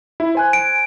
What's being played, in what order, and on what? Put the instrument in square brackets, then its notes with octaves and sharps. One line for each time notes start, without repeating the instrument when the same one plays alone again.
[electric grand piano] E4
C5 G#5 F#6
[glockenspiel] D7